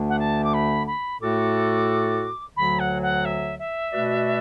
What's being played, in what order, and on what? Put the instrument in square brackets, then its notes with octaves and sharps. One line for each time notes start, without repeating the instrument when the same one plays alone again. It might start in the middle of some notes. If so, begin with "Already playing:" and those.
Already playing: [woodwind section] D2 D3 A3 D4
[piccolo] F#5
A5
D6
B5
B5
[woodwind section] A2 A3 F#4 A4 [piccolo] D6
[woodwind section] D2 D3 F#3 [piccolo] B5
[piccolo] F#5
F#5
E5
E5
[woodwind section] B2 A3 F#4 B4 D5